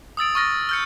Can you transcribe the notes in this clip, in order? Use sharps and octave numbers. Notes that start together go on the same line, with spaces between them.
D#6 E6 A6 D7
C#6 D#6 F6 A6 A#6
F6 G6 C#7